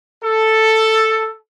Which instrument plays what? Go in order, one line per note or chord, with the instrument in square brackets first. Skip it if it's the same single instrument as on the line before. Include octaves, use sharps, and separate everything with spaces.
[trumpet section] A4